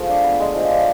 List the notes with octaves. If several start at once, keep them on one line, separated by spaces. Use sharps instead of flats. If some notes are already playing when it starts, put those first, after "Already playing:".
Already playing: F3 A3 F4 G#4
D4
B3
G#3
F3
D4